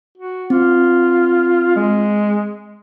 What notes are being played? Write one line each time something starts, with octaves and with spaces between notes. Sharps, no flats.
F#4
C4 F4
G#3